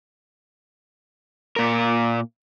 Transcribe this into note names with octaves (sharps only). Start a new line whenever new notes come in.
A#2 A#4